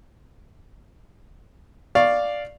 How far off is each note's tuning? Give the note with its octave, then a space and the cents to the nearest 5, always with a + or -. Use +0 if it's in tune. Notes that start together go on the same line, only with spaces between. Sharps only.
D5 +0 F5 +0 C#6 -15